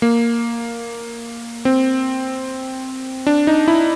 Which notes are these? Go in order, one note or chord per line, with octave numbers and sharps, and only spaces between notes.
A#3
C4
D4
D#4
E4